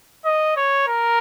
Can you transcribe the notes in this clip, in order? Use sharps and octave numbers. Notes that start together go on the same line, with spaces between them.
D#5
C#5
A#4